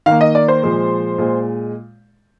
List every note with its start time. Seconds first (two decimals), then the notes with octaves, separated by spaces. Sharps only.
0.06 D#3 A#3 F5
0.21 D#5
0.35 D5
0.48 C5
0.63 A#2 F3 G#3
1.18 A#2 G#3